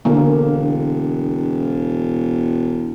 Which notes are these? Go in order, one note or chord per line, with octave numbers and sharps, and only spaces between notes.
E1 D3 A#3